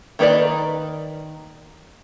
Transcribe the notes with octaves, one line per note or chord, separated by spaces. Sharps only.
D#3 A#3 D#4 B4 D5